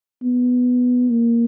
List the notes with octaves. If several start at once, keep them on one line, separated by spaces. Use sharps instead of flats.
B3
A#3